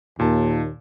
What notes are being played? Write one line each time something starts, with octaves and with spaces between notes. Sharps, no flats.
D#2 A#2 A5